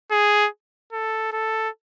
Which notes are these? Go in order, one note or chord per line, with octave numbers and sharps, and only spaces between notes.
G#4
A4
A4